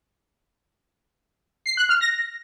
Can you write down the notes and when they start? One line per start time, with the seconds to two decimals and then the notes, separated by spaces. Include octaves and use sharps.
1.66 C7
1.77 F#6
1.89 F6
2.01 A#6